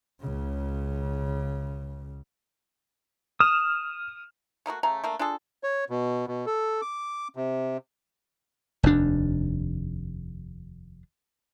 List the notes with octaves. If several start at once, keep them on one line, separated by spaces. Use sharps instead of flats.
C#2 C#3
D#6 F6 E7
A3 A#3 D#4 F#4
C#3 A3 A#5
A3 A#3 D4
D4 F4 G#4 A4
C#5
B2
B2
A4
D6
C3
F1 D#2 D4